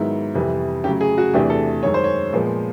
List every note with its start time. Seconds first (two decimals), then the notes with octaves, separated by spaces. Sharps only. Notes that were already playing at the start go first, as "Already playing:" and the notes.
Already playing: G#2 D#3 F#3 B3 E4
0.34 F2 C3 E3 G3
0.84 C#3 F#3 A3 G4
1.01 G#4
1.18 F#4
1.34 E2 C3 E3 A3 D4 G4
1.50 A4
1.83 F#2 D#3 G#3 C#5
1.94 C5
2.04 C#5
2.33 A#2 F3 G#3 B3